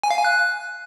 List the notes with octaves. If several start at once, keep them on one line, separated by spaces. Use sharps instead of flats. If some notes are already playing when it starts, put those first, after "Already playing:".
G#5
F5
G#5
F#6